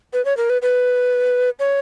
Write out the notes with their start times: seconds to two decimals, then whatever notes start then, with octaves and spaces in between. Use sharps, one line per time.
0.13 B4
0.25 C#5
0.37 A#4
0.50 B4
0.62 B4
1.59 C#5